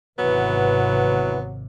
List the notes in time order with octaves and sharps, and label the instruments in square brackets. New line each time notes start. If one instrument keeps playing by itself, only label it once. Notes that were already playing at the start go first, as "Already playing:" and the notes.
[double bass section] G#1 C3 [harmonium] E3 [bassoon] F#3 [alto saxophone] B3